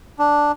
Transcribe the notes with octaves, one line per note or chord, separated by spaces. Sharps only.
D4